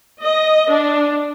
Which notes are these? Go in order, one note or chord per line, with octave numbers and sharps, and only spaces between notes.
D#5
D4